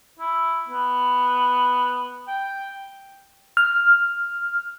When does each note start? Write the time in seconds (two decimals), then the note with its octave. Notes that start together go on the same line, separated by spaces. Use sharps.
0.19 E4
0.69 B3
2.27 G5
3.57 F6